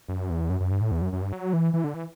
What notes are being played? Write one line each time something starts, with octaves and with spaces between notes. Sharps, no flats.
F#2
E2
F#2
F#2
G2
A2
E2
F#2
F#2
G2
F#3
E3
E3
D3
E3